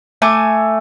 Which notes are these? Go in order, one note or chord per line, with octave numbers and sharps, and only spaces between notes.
A3 G#5 D6